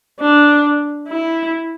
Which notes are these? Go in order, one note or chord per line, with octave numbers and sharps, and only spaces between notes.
D4
E4